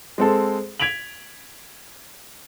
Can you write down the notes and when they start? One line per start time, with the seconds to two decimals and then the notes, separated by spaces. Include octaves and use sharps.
0.18 G#3 C4 A4
0.80 G#6 B6 D7 F7 F#7